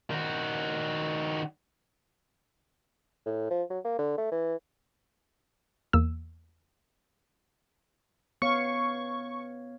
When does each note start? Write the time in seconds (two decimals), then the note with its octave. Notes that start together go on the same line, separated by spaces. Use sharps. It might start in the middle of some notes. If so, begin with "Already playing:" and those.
0.11 D#3 F#4
3.26 A2
3.50 F3
3.70 F#3
3.85 A#3
3.98 D3
4.18 A3
4.32 E3
5.93 E2 A#3 E6
8.42 B3 C#5 F5 C#6